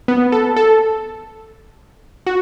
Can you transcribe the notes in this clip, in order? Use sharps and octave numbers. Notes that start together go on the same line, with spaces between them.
B3
A4
A4
F#4